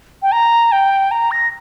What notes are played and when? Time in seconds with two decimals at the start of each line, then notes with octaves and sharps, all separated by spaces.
0.22 G5
0.32 A#5
0.72 G5
1.11 A#5
1.31 A#6